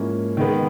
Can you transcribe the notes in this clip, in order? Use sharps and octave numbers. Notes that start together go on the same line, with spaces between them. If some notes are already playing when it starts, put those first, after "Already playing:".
Already playing: G#2 F3 A#3 C#4 E4
D#3 G#3 B3